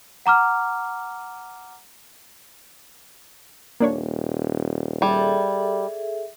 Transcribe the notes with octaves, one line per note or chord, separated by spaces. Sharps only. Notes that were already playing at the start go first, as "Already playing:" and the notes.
F#5 A#5 D6 F6
D#1 A#3 D4 C#5
G3 G#4 A4 E5